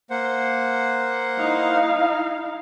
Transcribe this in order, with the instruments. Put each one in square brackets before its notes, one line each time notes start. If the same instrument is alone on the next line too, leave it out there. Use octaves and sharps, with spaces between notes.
[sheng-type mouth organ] A#3 C5 F#5
[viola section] D#4 E4 F5